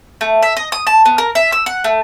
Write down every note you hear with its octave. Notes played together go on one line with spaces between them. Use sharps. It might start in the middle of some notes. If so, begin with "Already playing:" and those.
A3
E5
D#5
D#6
A5
B3
A#4
E5
E6
F#5
A3